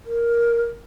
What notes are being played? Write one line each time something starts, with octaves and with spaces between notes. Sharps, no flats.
A#4